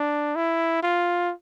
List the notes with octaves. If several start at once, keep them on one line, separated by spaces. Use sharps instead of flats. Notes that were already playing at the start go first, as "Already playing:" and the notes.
Already playing: D4
E4
F4